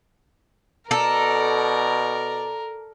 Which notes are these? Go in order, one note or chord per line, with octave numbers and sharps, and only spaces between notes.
B2 A4 A#4 D5 A#5